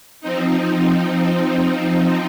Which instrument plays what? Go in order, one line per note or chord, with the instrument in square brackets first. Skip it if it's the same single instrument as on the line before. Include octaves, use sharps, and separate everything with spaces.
[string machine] F3 C4 D#4